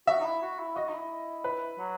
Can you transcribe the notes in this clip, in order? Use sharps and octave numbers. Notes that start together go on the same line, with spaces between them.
F#4 E5
D#4
E4
F#4
E4
F#4 D#5
D#4
E4
B4
F#3